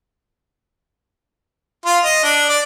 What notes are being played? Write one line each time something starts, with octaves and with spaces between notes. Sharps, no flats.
F4
D#5
D4
D5